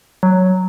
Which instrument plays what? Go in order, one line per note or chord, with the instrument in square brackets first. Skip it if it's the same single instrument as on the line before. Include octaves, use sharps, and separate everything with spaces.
[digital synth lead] F#3